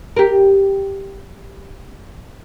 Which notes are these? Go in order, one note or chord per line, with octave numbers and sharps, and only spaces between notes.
G4 A#4